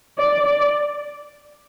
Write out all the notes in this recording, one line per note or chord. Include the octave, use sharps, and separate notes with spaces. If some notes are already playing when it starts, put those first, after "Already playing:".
D5
D5